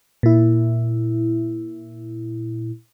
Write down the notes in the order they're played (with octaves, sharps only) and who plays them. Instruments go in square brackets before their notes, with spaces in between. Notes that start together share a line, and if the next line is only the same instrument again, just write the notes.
[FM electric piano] A#2 E4